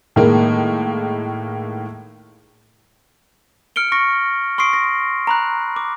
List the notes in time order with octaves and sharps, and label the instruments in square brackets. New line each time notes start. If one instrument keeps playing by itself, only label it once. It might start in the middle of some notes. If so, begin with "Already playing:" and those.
[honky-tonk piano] A2 D#3 G#3 A#3
[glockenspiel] F6 C#7 D7 G7
C#6 F6 A#6 C#7
C6 C#6 D#6 C7 D7
A#6
A#5 B5 F#6
D6